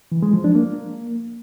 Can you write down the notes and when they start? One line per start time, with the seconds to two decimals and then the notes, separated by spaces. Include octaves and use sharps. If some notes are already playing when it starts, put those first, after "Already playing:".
0.12 E3
0.22 G#3
0.33 F3
0.44 D4
0.55 A#3